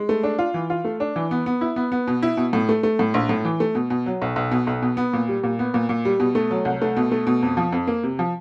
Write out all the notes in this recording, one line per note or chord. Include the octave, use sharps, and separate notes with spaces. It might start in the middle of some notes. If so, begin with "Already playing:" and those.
Already playing: G#3
A3
D4
F4
E3
F4
A3
D4
E3
B3
B3
E4
B3
B3
B2
E4
B2
A2
A3
A3
A2
A#1
A2
E3
A3
B2
B2
F#3
B1
B1
B2
B1
B2
B3
A#2
G3
A#2
B3
A#2
A#2
G3
B2
A3
F#3
C2
A3
B2
A3
B2
F2
F3
F2
A#3
C3
F3